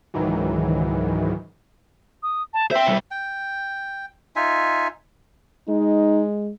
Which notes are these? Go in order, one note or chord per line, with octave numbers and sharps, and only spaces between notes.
C#2 G#2 D#3 E3 F#3
D#6
A5
C5 E5 G5
B1 G3
G5
D#4 F4 E5 G#5
G#3 D#4